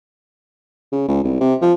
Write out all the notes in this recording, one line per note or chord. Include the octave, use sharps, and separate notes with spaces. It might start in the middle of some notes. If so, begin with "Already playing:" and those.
C#3
C#2
C2
C3
F3